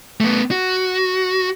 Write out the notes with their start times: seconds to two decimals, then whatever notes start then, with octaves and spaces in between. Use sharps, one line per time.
0.20 A3 B3
0.51 F#4